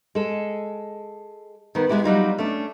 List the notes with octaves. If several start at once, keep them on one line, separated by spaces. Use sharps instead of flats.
G#3 A4
D#3 B3
G#3 A#3 B3 E4 G4
F#3 G3 D#4 F4
A3 C#4 D4